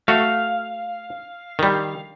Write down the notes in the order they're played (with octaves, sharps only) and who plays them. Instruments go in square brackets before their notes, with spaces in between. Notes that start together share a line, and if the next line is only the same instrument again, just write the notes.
[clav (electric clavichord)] A3 F#4 [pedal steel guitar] F5
[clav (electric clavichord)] D#3 G3